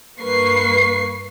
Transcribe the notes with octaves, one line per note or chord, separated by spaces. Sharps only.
G2 A#3 B4 C#6 C7